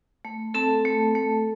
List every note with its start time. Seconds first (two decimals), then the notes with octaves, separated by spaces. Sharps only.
0.25 A3
0.54 C4 A4 A5
0.85 A3
1.15 A3